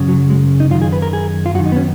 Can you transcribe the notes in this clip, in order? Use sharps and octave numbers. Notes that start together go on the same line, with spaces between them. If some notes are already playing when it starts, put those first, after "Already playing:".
Already playing: F#2 C#3
F#3
G#3
D#4
F#2 D#3 F4
G#4
B4
A#4
G#4
F4
F#2 D#3 F#4
D#4
B3
C#4